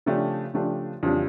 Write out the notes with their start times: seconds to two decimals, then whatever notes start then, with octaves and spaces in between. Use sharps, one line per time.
0.06 C#3 F3 A3 D4 G4
0.54 C#3 F3 A3 D4 G4
1.03 F2 C#3 E3 G3 D4